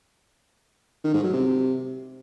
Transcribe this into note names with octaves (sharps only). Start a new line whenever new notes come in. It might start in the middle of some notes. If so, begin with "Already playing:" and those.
D#3
G#2
F#3
C3